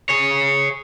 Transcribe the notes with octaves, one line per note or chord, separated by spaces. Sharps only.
G#4 C#5